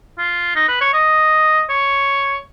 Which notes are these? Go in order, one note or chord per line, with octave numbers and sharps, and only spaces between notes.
F4
D#4
B4
C#5
D#5
C#5